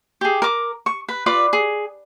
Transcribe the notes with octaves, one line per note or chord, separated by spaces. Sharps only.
G4 G#4
A#4 D6
C#6
B4
F4 B4 D5 D6
G#4